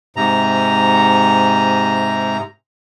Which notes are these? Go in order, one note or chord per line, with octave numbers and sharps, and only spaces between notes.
G#2 C3 A#5